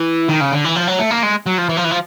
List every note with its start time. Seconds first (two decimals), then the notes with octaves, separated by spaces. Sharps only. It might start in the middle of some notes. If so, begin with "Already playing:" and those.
Already playing: E3
0.28 D#3
0.40 C#3
0.52 D3
0.64 E3
0.75 F3
0.87 F#3
0.99 A3
1.11 A#3
1.23 G#3
1.46 F#3
1.58 F3
1.69 E3
1.77 F3
1.84 E3
1.91 F3